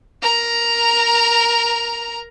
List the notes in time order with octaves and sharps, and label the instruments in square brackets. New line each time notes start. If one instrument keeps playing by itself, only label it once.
[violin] A#4 A#5